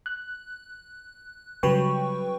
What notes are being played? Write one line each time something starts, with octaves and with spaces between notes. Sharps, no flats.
F#6
C#3 F#3 G3 B4 G5 C#6